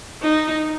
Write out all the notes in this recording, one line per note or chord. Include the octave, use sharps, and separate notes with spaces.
D#4